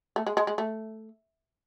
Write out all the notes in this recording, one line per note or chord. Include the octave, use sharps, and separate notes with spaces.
A3
G#3
G#3
G#3
A3